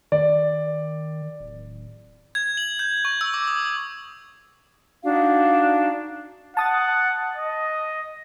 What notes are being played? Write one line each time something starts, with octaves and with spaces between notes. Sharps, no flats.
D#3 D5
D1
G#6
F#7
G6
C#6
E6
D6
D#6
D4 D#4 F#4 F5
F#5 A5 D#6 A6
D#5